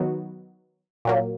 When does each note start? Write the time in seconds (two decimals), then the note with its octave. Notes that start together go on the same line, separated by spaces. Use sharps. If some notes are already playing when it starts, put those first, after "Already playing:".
Already playing: D#3 F#3 B3 D#4 F#4
1.05 A#2 F#3 A#3